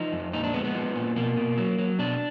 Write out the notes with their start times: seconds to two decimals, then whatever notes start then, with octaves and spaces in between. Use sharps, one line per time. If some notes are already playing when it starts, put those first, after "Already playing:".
Already playing: F3 D#4
0.12 F2
0.33 A#2 D#4
0.44 D4
0.54 G#3 B3
0.64 B3
0.75 F3
0.96 A#2
1.16 B2 A#3
1.37 B2
1.58 F#3
1.79 F#3
1.99 B2 D4